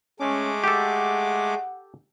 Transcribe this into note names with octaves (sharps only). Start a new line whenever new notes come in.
G#3 A3 C#4 D6
G4 A4 F#5